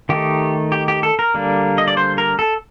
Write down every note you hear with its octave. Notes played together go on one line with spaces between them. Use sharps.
D#3 A3 D#4 G4
G4
G4
A4
A#4
D3 G3 A#3 D4
D#5
D5
C5
A#4
A4